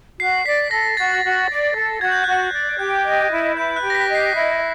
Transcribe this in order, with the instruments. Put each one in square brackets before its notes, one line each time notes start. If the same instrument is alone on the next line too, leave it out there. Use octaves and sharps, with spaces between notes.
[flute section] F#4 [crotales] C7
[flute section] D5 [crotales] B6
[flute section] A4 [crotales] A#6
[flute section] F#4 [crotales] A6
[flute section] F#4
D5
A4
[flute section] F#4 [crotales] G#6
[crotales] G6
[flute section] F#4 [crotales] F#6
[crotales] G6
[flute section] D5
[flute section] G4 [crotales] G6
[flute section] D#5
E4
[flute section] B4 [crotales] G6
[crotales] F#6
[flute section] G4
[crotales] A#6
B6
[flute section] D#5
[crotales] C7
[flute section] E4